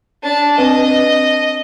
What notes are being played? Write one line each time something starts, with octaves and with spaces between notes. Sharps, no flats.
D4 A5
C4 B4 D#5